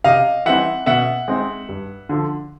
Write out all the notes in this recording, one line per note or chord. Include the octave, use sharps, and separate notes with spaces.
C3 D#5 F5
E3 G3 C4 D#4 E5 F#5
B2 E5 F#5
G#3 C4 D#4
G2
D3 F3